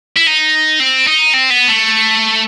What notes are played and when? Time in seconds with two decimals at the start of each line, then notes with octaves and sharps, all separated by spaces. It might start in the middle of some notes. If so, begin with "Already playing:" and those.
0.16 E4
0.26 D#4
0.80 C4
1.07 D#4
1.34 C4
1.50 B3
1.68 A3